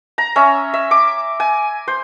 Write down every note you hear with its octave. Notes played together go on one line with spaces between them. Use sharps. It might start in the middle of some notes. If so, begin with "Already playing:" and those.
A#5
C#4 E5
E5
D6
G#5
C5